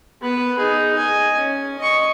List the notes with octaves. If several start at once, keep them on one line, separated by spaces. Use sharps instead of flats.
B3 B4
D#4 G#4
D#5 G#5
C#4
D#5 C#6